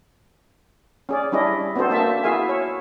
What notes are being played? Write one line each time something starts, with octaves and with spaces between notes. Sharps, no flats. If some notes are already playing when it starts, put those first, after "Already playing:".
C#4 G#4 D5
G3 C#4 D4 E4 G#4 D#5
B3 C4 D4 F#4 A4 C5
A#3 D4 E5 A5
E4 F#4 G#4 E5 F5 G#5
C#5